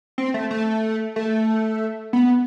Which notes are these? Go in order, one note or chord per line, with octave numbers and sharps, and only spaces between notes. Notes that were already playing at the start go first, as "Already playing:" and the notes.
C4
A3
A3
A3
B3